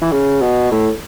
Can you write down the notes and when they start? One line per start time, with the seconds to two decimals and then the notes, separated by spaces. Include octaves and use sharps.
0.02 E3
0.12 C#3
0.41 B2
0.71 A2